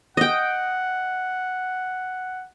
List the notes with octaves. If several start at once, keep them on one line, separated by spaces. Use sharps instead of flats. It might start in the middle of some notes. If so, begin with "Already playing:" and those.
D#5 F#5 G5